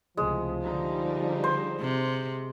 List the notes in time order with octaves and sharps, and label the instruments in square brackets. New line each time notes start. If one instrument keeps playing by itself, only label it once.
[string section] C#2 A2 C3 [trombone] F3 [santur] G#3
[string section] D3 G3 D#4
[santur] C5
[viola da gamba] C3